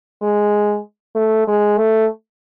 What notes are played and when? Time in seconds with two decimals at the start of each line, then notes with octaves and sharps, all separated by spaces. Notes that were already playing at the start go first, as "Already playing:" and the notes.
0.22 G#3
1.15 A3
1.47 G#3
1.77 A3